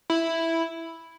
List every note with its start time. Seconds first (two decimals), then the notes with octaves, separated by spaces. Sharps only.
0.10 E4